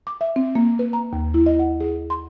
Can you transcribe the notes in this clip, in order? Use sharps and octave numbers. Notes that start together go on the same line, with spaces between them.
D6
E5
C4
A#3
B4
A#5
D#2
E4
D#5
F#5
G#4
C6